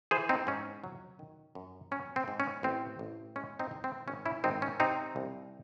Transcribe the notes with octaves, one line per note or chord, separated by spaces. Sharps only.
E3 G#4 C5
C4 D#4
G#2 C#4
F#3
D#3
F#2
F#3 C#4
C4
G#2
C#4
A1 C4
A1
G#3 C#4
C4 D#4
G#2
C4
G#1 C#4
C#4 E4
G#1 C4 D#4
C#4
C3 C4 D#4
C2